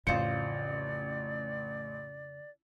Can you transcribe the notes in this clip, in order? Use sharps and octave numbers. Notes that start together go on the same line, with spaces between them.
A1 F2 C#3 F4 C5 D5 C#7